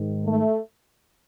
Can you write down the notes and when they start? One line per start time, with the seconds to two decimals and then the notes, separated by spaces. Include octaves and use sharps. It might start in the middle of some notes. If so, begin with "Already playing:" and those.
Already playing: G#2 D#3
0.25 A3